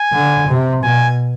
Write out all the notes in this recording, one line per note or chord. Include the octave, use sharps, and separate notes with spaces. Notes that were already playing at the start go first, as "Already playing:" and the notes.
Already playing: G#5
D3
C3
B2 G#5